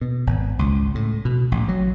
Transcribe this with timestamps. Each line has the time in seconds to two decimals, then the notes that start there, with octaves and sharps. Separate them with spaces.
0.01 B2
0.27 G#1
0.59 C#2
0.95 A2
1.25 B2
1.52 A1
1.68 F#3